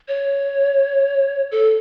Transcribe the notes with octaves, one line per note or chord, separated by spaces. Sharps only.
C#5
A4